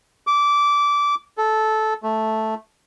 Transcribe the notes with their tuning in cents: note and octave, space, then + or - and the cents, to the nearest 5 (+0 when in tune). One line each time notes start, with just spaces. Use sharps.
D6 -15
A4 -15
A3 -5